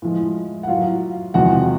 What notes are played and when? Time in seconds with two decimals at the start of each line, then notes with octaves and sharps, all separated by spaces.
0.02 A2 F3 G#3
0.63 F#5
0.68 A2 F#3 F4 F5
1.34 E2 C3 F3 G#3 F#4 F#5